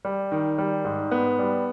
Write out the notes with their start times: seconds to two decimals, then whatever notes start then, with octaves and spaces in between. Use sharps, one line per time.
0.05 G3
0.32 D#3
0.58 G3
0.85 G#2
1.11 B3
1.39 G3